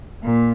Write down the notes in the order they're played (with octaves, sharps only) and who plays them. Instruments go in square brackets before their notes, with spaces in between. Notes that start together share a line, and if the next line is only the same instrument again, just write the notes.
[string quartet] A#2